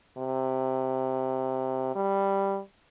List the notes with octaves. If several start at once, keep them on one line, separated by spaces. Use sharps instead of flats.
C3
G3